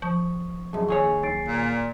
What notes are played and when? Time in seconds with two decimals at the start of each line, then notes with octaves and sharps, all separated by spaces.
0.02 F3 C#6 D#6
0.73 C2 F#2 G#4 D#5 A5
0.88 D#2 G#4 C#5 C#6
1.23 B1 A6 C7 D7
1.46 A#2